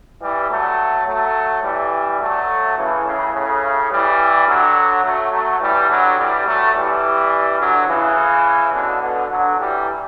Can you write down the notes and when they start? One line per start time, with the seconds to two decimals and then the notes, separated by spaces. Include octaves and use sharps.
0.21 E3 G3
0.50 F#3 A3
1.07 F#3 A3
1.63 E3 G3
2.20 F#3 A3
2.78 C#3 E3
3.06 A2 C#3
3.34 A2 C#3
3.91 E3 G3
4.47 D3 F#3
5.04 F#3 A3
5.32 F#3 A3
5.61 E3 G3
5.90 D3 F#3
6.19 E3 G3
6.46 F#3 A3
6.75 E3 G3
7.60 D3 F#3
7.88 C#3 E3
8.74 B2 D3
9.02 B2 D3
9.30 D3 F#3
9.58 E3 G3